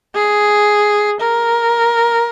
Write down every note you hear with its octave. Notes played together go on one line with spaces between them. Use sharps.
G#4
A#4